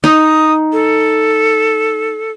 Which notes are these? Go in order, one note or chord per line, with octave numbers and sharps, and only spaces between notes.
D#4 D#6
A4